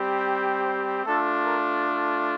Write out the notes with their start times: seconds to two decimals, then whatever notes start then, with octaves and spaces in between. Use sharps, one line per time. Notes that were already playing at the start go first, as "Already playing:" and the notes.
Already playing: G3 C4 G4
0.65 C5
1.05 A3 D4 F4 A4
1.46 A#4
1.86 A4